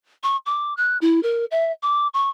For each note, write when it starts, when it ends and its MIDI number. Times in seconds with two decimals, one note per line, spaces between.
0.23 0.37 85
0.46 0.74 86
0.77 0.97 90
1.01 1.22 64
1.23 1.45 70
1.51 1.72 76
1.83 2.08 86
2.14 2.30 85